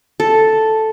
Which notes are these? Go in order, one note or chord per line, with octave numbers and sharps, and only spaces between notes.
A4